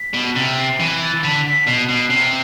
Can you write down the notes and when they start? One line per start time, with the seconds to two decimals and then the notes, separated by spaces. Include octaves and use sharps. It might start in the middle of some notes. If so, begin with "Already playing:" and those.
Already playing: B6
0.14 B2
0.36 C3 A6
0.59 C7
0.80 E3
1.02 A6
1.24 D3 B6
1.46 B6
1.67 B2 C7
1.89 B2 C7
2.10 C3 C7